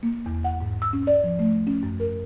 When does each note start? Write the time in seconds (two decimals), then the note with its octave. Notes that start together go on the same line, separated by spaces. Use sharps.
0.03 A#3
0.26 E2
0.44 F#5
0.61 G#2
0.82 E6
0.93 C#4
1.07 D5
1.24 F3
1.39 A3
1.67 C#4
1.83 F#2
2.00 A#4